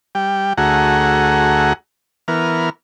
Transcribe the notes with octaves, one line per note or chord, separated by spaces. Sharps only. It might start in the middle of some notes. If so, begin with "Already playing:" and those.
G3 G5
D2 A3 F#4 G#4 F#5 A#5
E3 B3 A#4 F6